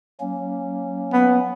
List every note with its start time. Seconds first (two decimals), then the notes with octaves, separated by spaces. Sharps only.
0.20 F#3 A#3 C#4
1.13 B3